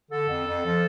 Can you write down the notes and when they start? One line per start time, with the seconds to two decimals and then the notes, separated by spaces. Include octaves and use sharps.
0.10 D3 A4
0.28 F2
0.46 F2
0.64 F3